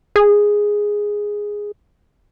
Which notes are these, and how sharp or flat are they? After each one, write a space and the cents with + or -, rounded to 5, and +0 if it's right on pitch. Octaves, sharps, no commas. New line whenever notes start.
G#4 -5